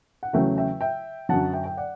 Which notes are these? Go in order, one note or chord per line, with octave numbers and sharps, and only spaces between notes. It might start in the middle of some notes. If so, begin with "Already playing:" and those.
F#5
E2 C#3 F#3 A3 C#4 E5 G5
E5 G5
E5 G5
F#2 D3 F#3 F#5 A5
E5 G5
G5
D5 F#5